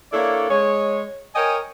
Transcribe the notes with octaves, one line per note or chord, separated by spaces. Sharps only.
A#3 D4 E4 A4 C#5 D5
G#3 C#5
A#4 C#5 D#5 G5 G#5